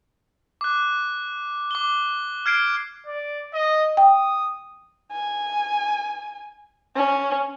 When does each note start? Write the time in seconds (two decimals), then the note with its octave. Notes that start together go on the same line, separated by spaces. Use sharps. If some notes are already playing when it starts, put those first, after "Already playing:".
0.61 D6 F#6
1.71 D6 G7
2.46 F6 G#6 C7 D7
3.07 D5
3.54 D#5
3.97 G5 D#6
5.12 G#5
6.96 C#4